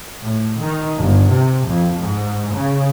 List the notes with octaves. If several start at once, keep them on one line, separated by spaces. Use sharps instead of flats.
A2
D#3
G1
C3
F2
G#2
C#3